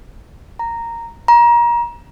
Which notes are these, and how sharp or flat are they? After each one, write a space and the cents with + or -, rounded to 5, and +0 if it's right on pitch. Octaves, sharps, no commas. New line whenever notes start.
A#5 -10
A#5 +30